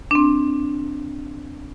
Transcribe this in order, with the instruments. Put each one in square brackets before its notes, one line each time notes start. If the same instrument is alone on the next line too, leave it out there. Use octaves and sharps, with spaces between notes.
[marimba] C4 D4